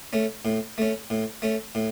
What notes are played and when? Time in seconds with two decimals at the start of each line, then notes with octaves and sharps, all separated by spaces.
0.13 A3 C#4
0.45 A2
0.78 A3 C#4
1.10 A2
1.42 A3 C#4
1.75 A2